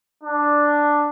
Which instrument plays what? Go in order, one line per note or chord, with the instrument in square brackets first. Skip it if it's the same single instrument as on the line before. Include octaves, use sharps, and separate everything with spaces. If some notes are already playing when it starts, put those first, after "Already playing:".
[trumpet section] D4